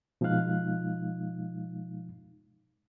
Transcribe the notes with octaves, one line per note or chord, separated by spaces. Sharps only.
B2 F3 G#3 D#4 F5 F#6